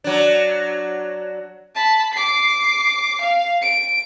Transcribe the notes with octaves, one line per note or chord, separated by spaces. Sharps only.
F#3 D4
A5 B5
D6 C7
F5
D7